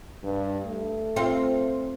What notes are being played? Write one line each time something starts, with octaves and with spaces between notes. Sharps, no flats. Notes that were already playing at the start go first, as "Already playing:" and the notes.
G2
A3
C4 F4